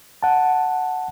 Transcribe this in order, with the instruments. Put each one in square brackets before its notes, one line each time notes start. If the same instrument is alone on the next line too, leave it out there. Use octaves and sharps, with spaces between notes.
[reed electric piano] F#5 A5